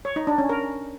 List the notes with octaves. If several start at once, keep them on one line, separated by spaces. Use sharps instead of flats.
C#5
D#4
D4
C#4
A#4